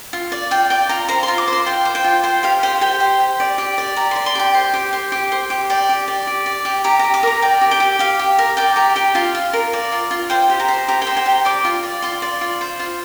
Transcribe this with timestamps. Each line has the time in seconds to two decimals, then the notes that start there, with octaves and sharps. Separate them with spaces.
0.13 F4
0.32 D5
0.51 F4 G5
0.70 D5 G5
0.89 F4 A#5
1.09 C5 A#5
1.23 C6
1.28 F4
1.38 D6
1.48 C5
1.53 C6
1.66 F4 G5
1.85 C5
1.95 G5
2.04 F4
2.24 C5 G5
2.43 G4 F5
2.63 C5 G5
2.81 G4 G5
3.00 C5
3.20 G4
3.40 D5
3.58 G4
3.78 D5
3.96 G4 A#5
4.11 C6
4.16 D5
4.26 C6
4.35 G4 G5
4.54 C5
4.73 G4
4.93 C5
5.12 G4
5.32 C5
5.50 G4
5.70 D5 G5
5.89 G4
6.08 D5
6.27 G4
6.46 D5
6.65 G4
6.84 G4 A#5
6.99 G4 A#5
7.14 D6
7.23 A#4 A#5
7.42 D5 G5
7.61 G4
7.71 G5
7.80 G4
7.99 G4 F5
8.19 G4
8.38 A#4
8.57 D5 G5
8.76 G4 A#5
8.96 G4 G5
9.15 F4 F5
9.35 F4
9.53 A#4
9.73 D5
9.92 F4
10.11 F4
10.30 C5 G5
10.50 G4
10.60 A#5
10.68 C5
10.88 G4 A#5
11.02 G5
11.07 C5
11.17 G5
11.26 G4
11.32 A#5
11.45 D5 D6
11.65 F4
11.83 D5
12.02 F4 C6
12.22 D5
12.41 F4
12.61 C5
12.80 F4